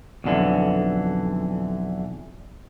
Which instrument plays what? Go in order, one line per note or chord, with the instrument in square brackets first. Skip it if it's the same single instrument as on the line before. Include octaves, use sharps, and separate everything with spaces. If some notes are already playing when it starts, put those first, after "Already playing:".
[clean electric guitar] B1 F2 D3 E3